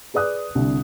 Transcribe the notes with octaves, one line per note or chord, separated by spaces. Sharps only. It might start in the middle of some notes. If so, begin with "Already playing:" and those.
G#4 B4 D5 D#6 F#6
C2 D3